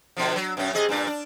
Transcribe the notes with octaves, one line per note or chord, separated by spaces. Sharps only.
B2 D3 F3
F#3
F#2 B2 C#4
C3 G#4 D#5
G2 A#2 D4
D4